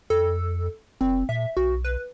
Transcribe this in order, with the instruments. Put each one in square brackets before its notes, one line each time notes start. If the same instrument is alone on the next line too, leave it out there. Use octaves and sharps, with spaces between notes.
[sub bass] F2 [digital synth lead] A4
[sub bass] F1 [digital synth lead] C4
[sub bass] A#2 [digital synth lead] E5
[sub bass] B1 [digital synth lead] F#4
[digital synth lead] B4